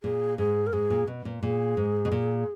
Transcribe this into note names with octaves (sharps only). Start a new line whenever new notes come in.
A#2 G#4
G#2 G#4
A#4
G#2 G#4
A#2
B2
A#2
A#2 G#4
G#2
B2
A#2